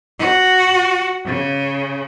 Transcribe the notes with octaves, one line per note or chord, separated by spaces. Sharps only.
F#4
C#3